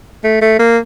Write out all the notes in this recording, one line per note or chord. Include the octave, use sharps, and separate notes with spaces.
A3
A3
A#3